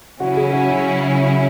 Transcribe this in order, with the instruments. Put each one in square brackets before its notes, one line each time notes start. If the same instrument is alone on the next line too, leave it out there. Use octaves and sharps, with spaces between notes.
[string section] C#3 F#3 C#4 E4 [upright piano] F#4
[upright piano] G#4
F#4
F#4